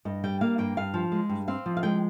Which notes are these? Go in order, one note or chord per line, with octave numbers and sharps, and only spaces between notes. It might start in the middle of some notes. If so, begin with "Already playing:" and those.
G2 D#5
G3 G5
A#3 F5
G2 G5
G2 F5
F3
G#3
G2
C4 F5
F3
F5
G#3 G5